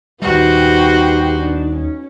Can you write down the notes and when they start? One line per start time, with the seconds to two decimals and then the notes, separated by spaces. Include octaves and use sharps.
0.22 D#2 G3 D#4 F#4 G4 B4 C5
1.39 D4 D#4
1.74 C#4